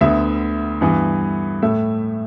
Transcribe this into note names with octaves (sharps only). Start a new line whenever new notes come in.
D2 D3 B3 E5
G2 E3 B3
A2 A3 E5